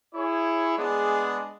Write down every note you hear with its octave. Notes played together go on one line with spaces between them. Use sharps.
E4 G#4 C#5
G#3 B3 D4 G#4